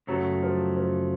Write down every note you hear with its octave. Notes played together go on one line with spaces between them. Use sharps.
F#2 C#3 F#3 A3
F3
F3